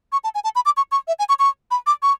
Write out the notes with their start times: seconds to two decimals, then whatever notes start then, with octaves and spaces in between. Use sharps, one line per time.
0.12 C#6
0.24 A5
0.35 G#5
0.44 A5
0.55 B5
0.66 D6
0.77 C#6
0.92 C#6
1.08 E5
1.19 G#5
1.29 C#6
1.39 C#6
1.71 B5
1.87 D6
2.03 C#6